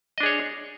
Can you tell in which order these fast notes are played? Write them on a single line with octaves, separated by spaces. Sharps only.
D#5 D4 G#4 C#5